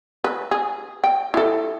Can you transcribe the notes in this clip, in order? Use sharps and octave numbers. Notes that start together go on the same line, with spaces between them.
B4
G#4
G5
E4 A4